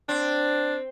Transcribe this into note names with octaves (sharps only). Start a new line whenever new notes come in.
C4 D4